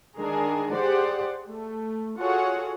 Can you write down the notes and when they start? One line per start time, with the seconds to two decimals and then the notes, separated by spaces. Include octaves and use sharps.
0.17 D#3 G#3 D4 G#4 A#4
0.73 G4 G#4 C5 D5 F#5
1.49 A3
2.19 F4 F#4 G#4 A4 C#5 F#5